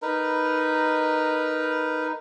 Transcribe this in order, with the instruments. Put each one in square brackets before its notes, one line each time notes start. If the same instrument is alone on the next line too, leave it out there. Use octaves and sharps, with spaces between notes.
[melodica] D#4 A#4 B4